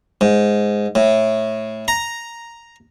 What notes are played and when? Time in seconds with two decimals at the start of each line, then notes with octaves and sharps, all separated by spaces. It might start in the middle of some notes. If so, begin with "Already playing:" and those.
0.21 G#2
0.95 A2
1.88 A#5